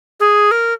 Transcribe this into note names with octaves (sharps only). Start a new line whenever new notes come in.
G#4
A#4